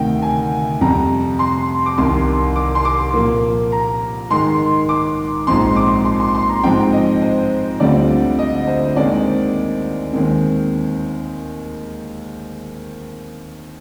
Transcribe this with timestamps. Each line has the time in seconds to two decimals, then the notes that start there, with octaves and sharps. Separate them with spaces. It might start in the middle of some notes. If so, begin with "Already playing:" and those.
Already playing: D2 C3 D#3 G5
0.22 G#5
0.81 F2 C3 G3 A#5
1.39 C6
1.86 D6
1.98 C2 C3 D#3 C6
2.56 D6
2.75 C6
2.85 D6
3.14 A#2 F3 A#3
3.72 A#5
4.30 G#2 D#3 G#3 D#4 C6
4.89 D6
5.47 A#1 G#2 F3 C4 D#4 C6
5.76 D6
6.05 C6
6.20 C6
6.35 C6
6.49 A#5
6.63 G#2 F3 G#3 C4 D#4 G5
6.93 D#5
7.22 C5
7.80 D2 D3 G3 C4 F4 D5
8.39 D#5
8.67 C5
8.96 D#2 D#3 G#3 C4 D5
10.13 D#2 D#3 G#3 C4